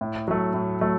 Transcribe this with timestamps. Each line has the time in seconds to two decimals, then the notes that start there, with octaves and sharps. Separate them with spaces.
0.01 A2
0.28 F#3 A3
0.54 A2
0.81 F#3 A3